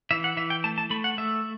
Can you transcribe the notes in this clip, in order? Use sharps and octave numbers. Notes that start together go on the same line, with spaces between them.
E3 E5
F#5
E3 E5
G5
A3 A5
A5
A3 B5
F#5
A3 E5